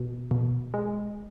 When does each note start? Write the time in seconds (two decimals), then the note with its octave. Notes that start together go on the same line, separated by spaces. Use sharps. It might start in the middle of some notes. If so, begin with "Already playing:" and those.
Already playing: B2
0.31 B2
0.74 G#3